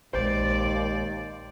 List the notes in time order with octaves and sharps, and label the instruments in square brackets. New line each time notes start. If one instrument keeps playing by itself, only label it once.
[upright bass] A#1 G#3 [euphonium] D#2 [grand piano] C5 [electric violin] D5